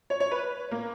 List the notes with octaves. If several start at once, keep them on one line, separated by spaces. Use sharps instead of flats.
C#5
C#5
B4
A#3